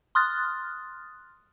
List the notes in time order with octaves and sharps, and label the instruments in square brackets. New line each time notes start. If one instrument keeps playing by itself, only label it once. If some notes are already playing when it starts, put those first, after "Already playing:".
[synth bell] C6 D#6 F6 F#6 A6